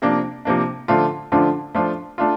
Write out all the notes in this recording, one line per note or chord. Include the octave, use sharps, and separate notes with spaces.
C3 F3 A#3 D4
C3 F3 A#3 D4
D3 F3 A3 D4 F4
D3 F3 A3 D4 F4
F3 A3 D4 F4
A3 D4 F4